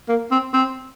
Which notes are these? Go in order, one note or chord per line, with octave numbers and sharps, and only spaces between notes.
A#3
C4
C4